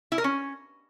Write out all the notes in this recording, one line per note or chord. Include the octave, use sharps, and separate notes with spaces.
E4
A#4
C#4